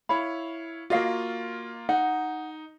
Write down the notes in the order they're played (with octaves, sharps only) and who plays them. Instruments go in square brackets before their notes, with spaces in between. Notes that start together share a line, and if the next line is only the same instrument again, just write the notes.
[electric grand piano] E4 C#5 F5 [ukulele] B5
[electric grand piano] A#3 F4 [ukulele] F#4 D#5 F5
[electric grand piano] D#4 [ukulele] F#5